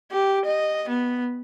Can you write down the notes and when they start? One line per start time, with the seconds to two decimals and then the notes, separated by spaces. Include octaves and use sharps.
0.12 G4
0.46 D#5
0.89 B3